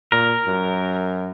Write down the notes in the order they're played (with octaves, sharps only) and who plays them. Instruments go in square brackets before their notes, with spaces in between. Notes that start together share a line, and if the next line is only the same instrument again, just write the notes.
[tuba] A#2 [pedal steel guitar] A#4
[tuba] F#2